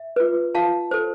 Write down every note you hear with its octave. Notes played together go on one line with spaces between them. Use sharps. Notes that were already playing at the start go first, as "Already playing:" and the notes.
Already playing: E5
F4 B4
F4 F5 A5
A4 C5